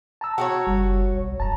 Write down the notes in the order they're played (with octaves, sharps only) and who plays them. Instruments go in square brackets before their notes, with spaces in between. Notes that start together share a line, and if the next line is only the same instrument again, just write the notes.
[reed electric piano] A5 A#5 E6
[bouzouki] F#4 G4 C#5
[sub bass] F#1 [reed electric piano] G3
[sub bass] B1
[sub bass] E1 [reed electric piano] F#2 A5 A#5